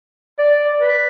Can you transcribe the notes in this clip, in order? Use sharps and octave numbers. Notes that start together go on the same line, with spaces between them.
D5
B4